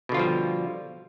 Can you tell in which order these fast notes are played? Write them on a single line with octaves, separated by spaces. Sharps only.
B2 D3 F4 F3 G3